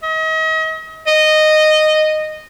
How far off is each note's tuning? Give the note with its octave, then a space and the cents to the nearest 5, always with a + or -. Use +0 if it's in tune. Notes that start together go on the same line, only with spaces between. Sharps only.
D#5 +40
D#5 -15